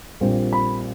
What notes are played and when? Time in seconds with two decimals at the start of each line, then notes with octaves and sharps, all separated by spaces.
0.21 A#1 A#2 G3 C4
0.53 B5